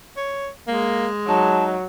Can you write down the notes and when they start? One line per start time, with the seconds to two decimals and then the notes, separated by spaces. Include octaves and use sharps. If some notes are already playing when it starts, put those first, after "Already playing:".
0.17 C#5
0.68 G#3 A#3
1.28 F#3 D#4 A5